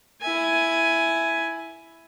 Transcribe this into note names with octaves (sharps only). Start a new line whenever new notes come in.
E4 G#5